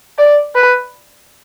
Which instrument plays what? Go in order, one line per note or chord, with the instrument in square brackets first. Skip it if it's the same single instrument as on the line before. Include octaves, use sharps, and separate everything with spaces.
[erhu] D5
B4